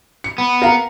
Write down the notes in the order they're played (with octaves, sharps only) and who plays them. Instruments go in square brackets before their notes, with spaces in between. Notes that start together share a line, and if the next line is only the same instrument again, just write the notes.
[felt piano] C#7
[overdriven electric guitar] B3
[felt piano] A#4 F5 A#5